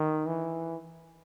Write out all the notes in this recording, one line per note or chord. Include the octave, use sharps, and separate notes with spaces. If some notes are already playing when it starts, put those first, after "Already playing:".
Already playing: D#3
E3